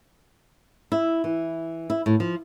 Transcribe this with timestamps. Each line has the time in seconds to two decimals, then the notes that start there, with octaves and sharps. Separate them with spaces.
0.92 E4
1.24 E3
1.90 E4
2.06 A2
2.20 F3